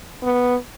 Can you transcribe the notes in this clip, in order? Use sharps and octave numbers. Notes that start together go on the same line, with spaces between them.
B3